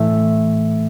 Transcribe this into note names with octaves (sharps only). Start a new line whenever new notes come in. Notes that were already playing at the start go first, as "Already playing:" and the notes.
Already playing: A2 E3 A3 E5